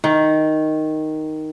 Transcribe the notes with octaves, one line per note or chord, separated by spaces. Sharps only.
D#3